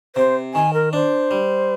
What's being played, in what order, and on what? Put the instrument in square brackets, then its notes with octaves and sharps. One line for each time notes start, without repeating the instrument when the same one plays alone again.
[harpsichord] C3 [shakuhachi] C5
[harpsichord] D#3 [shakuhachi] G#5
[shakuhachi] A#4
[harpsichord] D4 [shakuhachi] C5
[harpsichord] G3